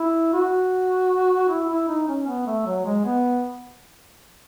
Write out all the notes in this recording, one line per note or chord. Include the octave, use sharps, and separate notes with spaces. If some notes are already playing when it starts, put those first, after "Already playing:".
Already playing: E4
F#4
E4
E4
D#4
C#4
B3
A3
F#3
G#3
B3